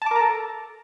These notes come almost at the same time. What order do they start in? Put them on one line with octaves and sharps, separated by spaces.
A5 D6 A#4 A#5 A4